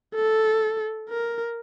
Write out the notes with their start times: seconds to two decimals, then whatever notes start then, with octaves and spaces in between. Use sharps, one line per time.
0.15 A4
1.09 A#4